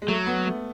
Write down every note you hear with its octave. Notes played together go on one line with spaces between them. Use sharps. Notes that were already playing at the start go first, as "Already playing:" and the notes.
G#3
F#3 A3
B3
A3